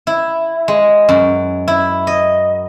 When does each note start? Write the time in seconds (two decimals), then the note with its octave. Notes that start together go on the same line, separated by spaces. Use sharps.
0.07 E4
0.68 G#3
1.09 F#2
1.68 E4
2.07 D#5